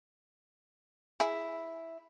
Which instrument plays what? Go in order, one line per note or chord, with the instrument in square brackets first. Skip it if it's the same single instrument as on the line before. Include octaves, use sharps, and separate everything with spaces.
[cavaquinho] E4 [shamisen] G#4 E5